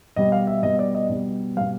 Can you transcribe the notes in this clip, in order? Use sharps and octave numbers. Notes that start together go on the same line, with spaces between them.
B2 G3 D#5
F5
E5
B2 G3 D#5
D5
D#5
B2 G3
B2 G3 F5